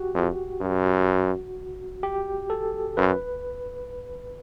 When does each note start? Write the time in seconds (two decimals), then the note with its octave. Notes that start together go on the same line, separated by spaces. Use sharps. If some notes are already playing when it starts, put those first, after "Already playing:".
Already playing: F#4 G4
0.14 F2
0.61 F#2
2.03 G4
2.50 A4
2.97 F#2 B4